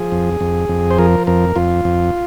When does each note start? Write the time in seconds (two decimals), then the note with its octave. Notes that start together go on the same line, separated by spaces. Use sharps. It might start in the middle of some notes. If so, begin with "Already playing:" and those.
Already playing: F3 G#4
0.12 F2
0.40 F2
0.69 F2
0.91 C5
0.98 F3 A#4
1.27 F2 A#4
1.56 F2 F4
1.85 F2